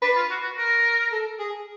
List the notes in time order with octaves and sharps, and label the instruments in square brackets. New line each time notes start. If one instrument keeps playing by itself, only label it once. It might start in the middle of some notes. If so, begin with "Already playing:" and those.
[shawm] D4 [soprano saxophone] B4
[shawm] F4
F#4
F#4
A#4
[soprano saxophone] A4
G#4